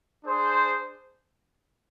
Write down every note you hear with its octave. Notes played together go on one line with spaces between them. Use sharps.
D4 G#4 C5